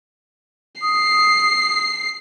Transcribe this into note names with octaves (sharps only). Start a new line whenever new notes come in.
D#6 C7